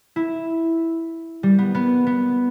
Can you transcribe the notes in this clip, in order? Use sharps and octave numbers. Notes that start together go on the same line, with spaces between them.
E4
G3
B3
B3
B3